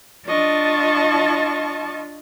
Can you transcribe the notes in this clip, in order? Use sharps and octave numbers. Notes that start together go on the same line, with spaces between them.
D4 F4 D#5 A5 C#6